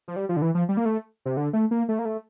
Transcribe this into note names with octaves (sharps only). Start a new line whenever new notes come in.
F3
G3
F3
D3
E3
F3
G3
A#3
A3
C3
D3
A3
A#3
A3
A#3
A3